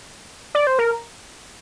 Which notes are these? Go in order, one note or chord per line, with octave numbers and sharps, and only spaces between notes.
D5
C5
A#4